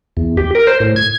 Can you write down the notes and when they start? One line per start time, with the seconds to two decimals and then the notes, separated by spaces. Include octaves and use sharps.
0.17 E2
0.37 G4
0.55 A#4
0.67 C5
0.80 A2
0.96 G#6